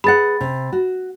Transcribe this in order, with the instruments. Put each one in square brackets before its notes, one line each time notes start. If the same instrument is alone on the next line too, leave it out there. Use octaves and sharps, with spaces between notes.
[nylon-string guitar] G#4 B4 F#5 [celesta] B5 A6
[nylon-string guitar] C3
F#4